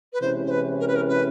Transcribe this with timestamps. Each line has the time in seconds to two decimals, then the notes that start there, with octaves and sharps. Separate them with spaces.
0.13 B4
0.21 C3 E3 G#3 C#4 E4 C5
0.46 C5
0.50 B4
0.80 A#4
0.87 B4
0.96 A#4
1.09 B4